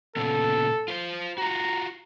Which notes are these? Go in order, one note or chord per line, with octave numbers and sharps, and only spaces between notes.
A#2 C#3 B3 A4
F4 B4 C5
F4 F#4 A#5